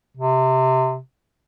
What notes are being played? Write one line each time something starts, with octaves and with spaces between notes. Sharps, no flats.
C3